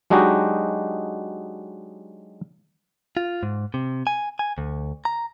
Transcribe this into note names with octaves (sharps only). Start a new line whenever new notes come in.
F#3 G#3 D4 D#4 F#4 G4
F4
G#2
C3
G#5
G#5
D2
A#5